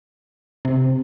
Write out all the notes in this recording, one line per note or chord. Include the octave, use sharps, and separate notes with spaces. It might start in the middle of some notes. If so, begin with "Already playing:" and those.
C3